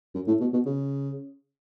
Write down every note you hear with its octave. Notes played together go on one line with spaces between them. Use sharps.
F#2
A2
B2
B2
C#3